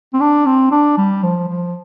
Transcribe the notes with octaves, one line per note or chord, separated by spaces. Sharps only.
C4
D4
C4
D4
G3
F3
F3